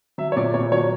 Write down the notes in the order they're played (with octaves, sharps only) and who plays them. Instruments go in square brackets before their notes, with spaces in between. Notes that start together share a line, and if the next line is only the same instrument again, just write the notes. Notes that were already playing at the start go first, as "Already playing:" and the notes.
[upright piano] F#3 E5
C#5
A#2 D5
A#2 C#5
F#3 C#5